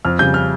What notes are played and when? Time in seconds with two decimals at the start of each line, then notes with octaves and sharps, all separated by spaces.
0.05 F2 F6
0.19 C#3 G3 G6
0.34 F6